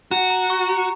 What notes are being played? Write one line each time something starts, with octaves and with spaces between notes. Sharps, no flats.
F#4 A#5
A#5
C#6
A#5